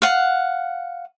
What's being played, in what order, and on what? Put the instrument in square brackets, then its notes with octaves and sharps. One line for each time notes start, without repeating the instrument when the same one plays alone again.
[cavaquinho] F5 F#5